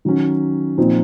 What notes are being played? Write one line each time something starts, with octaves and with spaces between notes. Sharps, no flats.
D#3 F#3 C#4
A#2 F3 C4 D#4